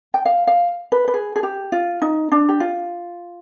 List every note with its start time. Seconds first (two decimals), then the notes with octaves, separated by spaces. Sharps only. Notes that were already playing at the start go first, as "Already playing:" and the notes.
0.14 G5
0.25 F5
0.47 F5
0.92 B4
1.08 B4
1.14 G#4
1.36 G#4
1.43 G4
1.72 F4
2.02 D#4
2.32 D4
2.49 G4
2.60 F4